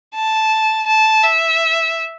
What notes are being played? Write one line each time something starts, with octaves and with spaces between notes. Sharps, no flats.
A5
A5
E5